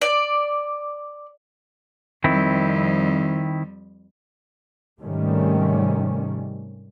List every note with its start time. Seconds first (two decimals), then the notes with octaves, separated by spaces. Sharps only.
0.01 D5
2.24 F2 D#3 G3 C4 E4
5.01 G#2 C3 D#3 G3 A3 C#4